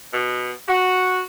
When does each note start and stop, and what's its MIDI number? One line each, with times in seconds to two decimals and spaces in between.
0.12 0.51 47
0.68 1.21 66